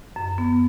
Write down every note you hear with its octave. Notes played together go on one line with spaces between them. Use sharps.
F#2
B3